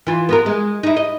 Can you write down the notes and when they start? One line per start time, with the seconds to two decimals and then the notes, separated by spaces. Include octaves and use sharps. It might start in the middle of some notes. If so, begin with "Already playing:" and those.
0.07 E3 F4
0.29 B3 F4 A#4
0.46 G#3
0.83 D#4 E4
0.97 D#5